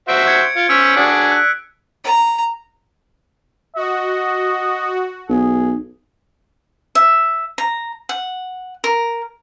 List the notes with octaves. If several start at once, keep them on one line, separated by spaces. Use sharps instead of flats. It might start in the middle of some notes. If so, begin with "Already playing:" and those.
F#4 C5 E5 D7
G#6 C#7
F4 C#7 D7
C#4 C5 C#5 E6 B6
D4 F#4 G#4
F#6
A#5
F#4 D#5
B1 G#4
E5
A#5
F#5
A#4